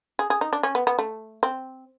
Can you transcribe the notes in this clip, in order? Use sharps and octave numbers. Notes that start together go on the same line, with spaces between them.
G#4
G#4
D#4
D4
C#4
B3
B3
A3
C4